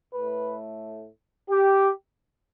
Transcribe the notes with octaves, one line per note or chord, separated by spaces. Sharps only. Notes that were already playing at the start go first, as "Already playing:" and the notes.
A2 A3 B4
G4